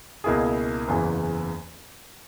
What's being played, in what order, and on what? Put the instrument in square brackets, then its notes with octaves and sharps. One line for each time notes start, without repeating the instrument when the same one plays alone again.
[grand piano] C#2 B2 A#3 E4 G#4
F#1 E2 C#3 E3